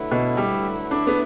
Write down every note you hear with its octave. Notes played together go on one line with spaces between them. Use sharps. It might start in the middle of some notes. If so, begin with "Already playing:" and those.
Already playing: D3 F#3 A3 E4 B4
B2
G3
D4
B3